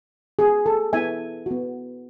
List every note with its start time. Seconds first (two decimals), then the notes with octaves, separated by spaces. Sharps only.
0.39 B3 F#4 G#4
0.66 A4
0.93 B3 E4 E5 G#5
1.46 B3 F#4